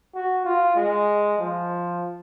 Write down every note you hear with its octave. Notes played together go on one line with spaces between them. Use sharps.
F#4
F4
G#3
F3